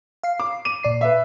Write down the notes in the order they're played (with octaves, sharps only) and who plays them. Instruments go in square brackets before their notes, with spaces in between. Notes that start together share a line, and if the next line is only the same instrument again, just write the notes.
[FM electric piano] F5 C7
[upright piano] D6
[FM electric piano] D6 [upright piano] D#7
[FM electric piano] A#2 D5 C7
[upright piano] B4 E5